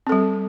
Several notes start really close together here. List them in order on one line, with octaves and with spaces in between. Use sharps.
C4 A4 G3